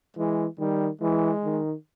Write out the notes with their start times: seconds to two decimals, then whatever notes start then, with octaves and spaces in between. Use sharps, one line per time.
0.17 E3 G#3
0.60 D#3 G3
1.01 E3 G#3
1.44 D#3